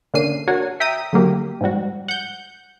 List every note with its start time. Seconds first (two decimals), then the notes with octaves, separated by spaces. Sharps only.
0.14 D3 A#3 C#4 D4 C7 D#7
0.48 D4 F#4 A#4 C#5
0.80 E5 G5 A#5 D#6
1.13 D3 F#3 A#3 G4
1.61 G#2 F3 G3 F#4
2.08 F#5 G6